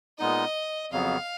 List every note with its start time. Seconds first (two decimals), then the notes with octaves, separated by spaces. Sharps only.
0.19 A#2 G#3 B3 D#4 D#5
0.92 F2 C#3 F#3 B3 F5